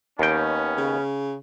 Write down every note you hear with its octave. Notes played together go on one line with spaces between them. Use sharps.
D#2 B3 C#4 G5
C#3